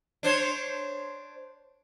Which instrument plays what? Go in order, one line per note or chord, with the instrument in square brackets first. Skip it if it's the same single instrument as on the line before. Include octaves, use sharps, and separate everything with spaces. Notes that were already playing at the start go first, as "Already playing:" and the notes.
[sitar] D4 C5 C#5